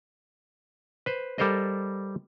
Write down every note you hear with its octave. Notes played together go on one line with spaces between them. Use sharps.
B4 C5
G3 A4 A#4 C5 D#5